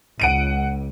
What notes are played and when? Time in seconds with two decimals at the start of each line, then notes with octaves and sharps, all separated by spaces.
0.20 C#2 F#5 D7 D#7